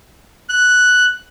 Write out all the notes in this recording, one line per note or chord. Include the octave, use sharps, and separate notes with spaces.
F#6